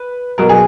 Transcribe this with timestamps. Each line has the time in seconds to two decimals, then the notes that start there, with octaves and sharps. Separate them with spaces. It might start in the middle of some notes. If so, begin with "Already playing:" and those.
Already playing: B4
0.38 B2 F#3 A#4
0.49 G#4